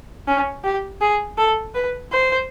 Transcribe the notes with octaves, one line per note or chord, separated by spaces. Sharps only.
C#4
G4
G#4
A4
B4
C5